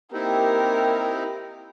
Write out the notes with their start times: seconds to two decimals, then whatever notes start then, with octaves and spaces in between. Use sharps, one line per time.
0.13 A#3 C4 D#4 E4 G4 A#4